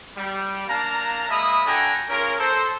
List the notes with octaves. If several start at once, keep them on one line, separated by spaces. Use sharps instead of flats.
G3
A#3 D4 F5 A5 A#5
G#3 A#3 E5 B5 D#6
D4 F#4 A4 G5 G#5 A#5
C#4 F4 G#4 A#4
A4 C5